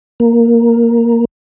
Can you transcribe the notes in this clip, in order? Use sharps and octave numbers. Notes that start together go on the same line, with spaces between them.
A#3